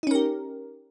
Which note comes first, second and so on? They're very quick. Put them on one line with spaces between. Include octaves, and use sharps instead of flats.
D#4 C#4 A#4 G4